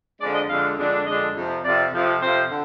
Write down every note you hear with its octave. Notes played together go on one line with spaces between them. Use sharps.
F2 D3 G#3 D4 D5
D#5
F2 D3 G#3 D4 F5
F2 D3 G#3 D4
F2 D3 G#3 D4 D#5
F2 C3 F3
F2 C3 F3 D5
F2 C3 F3
F2 C3 F3 C5
D3